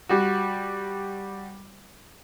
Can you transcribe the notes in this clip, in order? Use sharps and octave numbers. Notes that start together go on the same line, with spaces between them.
G3 F#4